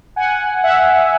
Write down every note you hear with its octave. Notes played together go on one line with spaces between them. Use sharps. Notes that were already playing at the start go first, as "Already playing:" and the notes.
F#5 G#5
E5 F#5